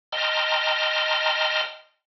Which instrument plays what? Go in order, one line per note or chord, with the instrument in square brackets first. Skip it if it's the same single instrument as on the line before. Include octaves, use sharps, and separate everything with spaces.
[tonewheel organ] D#5 G5 A5 A#5 C6 F6